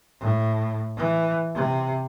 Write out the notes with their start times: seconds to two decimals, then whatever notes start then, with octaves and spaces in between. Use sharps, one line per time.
0.20 A2
0.97 E3
1.55 C3